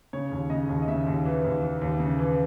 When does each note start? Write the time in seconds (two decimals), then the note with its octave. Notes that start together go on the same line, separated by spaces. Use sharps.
0.13 C#3 C#5
0.31 D#2
0.50 C#3 D#5
0.69 D#2
0.82 D#5
0.88 C#3 E5
1.06 D#2
1.25 E3
1.44 D#2
1.62 E3
1.81 D#2
2.00 C#3
2.19 E3